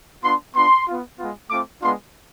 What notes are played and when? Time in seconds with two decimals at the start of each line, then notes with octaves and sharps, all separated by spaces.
0.23 B3 D4 F4 C6
0.54 B3 D4 F4 C6
0.86 B3 F4
1.17 G#3 B3 F4
1.49 A3 C4 F4 D6
1.80 G#3 B3 D4 F4 C6